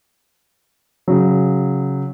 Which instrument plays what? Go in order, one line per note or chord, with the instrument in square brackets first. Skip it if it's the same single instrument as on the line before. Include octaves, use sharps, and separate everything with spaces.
[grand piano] C#3 F#3